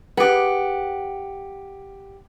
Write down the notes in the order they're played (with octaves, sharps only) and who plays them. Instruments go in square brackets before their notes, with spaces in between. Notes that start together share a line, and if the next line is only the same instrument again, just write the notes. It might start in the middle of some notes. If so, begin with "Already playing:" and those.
[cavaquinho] G4 F#5 [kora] G#4 B4